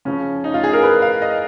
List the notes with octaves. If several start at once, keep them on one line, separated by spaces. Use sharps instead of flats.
C#3 F3 C#4
D#4
F4
G#4
A#4
B4
F5
D#5